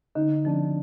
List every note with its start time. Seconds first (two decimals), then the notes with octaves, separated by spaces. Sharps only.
0.15 D3 D#4
0.45 F3 C4 D4